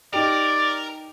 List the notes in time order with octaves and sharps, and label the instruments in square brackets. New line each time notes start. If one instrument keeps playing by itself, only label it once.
[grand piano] D#4 G4 [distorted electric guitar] A#4 [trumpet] D5